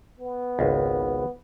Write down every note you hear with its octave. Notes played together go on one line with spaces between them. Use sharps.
B3
G#1 C#2